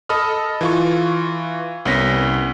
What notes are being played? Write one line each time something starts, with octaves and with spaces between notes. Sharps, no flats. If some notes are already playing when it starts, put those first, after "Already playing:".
A4 D#5 B5 D#6 F6
E3 F4 C#6
C2 B3 C#4 A#6 B6